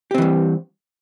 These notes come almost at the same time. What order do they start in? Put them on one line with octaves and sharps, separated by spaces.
G4 C4 E3 G3